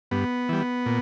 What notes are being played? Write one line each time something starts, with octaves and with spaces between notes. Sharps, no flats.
G2 B3
E3 G3
A#2